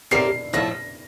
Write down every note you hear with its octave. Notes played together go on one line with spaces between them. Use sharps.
A2 G3 C4 G4 A#4 C7
A2 F3 A3 E4 A4 A#6